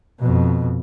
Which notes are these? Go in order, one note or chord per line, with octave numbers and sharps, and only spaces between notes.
F2 B2